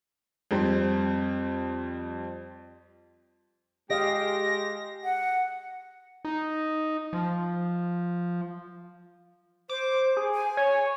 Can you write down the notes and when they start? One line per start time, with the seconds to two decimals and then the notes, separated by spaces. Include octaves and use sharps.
0.51 F2 G3 C4
3.90 G#3 G4 G#4 D#5 F5 A#6
5.04 F#5
6.25 D#4
7.13 F3
9.69 C5 D6
10.17 G#4
10.34 G#5
10.57 C#5